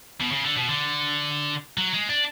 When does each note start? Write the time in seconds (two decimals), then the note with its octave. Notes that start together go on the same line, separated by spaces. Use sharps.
0.21 B2
0.32 C#3
0.44 D3
0.56 B2
0.68 D3
1.78 F#3
1.93 G#3
2.09 D4